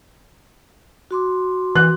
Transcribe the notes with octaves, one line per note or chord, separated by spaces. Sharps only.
F#4 C6 D6
E3 F#6